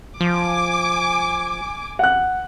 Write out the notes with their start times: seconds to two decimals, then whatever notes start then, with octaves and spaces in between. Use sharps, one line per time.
0.20 F3 G#5 D6
1.99 F#5 F#6